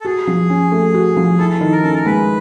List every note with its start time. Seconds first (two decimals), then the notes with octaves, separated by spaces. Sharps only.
0.01 A4
0.05 F#4 G#4
0.27 F3
0.50 C#4
0.72 A3
0.94 F#4
1.17 F3
1.39 E4 A4
1.61 D#3
1.72 A#4
1.83 C#4 A4
1.95 A#4
2.06 G#3 B4